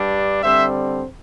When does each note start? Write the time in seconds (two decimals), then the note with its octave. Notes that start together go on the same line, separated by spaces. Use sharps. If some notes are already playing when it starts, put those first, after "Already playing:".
Already playing: G2 G3 D4
0.43 D3 G3 C4 C5 E5